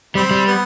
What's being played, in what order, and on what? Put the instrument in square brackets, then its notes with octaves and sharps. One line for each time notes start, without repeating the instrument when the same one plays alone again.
[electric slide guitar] G3 [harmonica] C4
[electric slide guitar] G3
[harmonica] B3